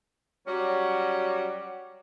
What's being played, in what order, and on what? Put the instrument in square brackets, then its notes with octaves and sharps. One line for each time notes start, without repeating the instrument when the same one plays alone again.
[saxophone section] F#3 G3 C#4 F#4